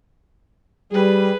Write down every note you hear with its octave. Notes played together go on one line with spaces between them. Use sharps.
G3 G#4 B4